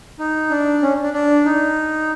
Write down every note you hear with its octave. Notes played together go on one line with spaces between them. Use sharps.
D#4
D4
C#4
D4
D4
D#4